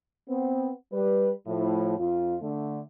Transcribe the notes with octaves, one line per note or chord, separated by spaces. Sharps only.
B3 C4
G3 B4
A2 F3
F2 F4
D3 A3